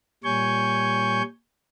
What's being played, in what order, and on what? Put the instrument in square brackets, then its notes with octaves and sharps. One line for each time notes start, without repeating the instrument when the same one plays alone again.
[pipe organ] A#2 G3 C#5 G#5 C#6 G6